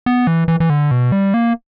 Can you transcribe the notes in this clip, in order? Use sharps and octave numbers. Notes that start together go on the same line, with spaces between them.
B3
E3
E3
E3
D3
B2
G3
A#3